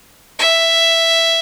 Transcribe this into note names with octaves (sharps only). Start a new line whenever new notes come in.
E5